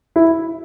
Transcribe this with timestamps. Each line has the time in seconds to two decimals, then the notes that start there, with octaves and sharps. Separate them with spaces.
0.16 E4